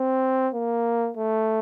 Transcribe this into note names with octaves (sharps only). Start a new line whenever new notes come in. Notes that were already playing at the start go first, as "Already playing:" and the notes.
Already playing: C4
A#3
A3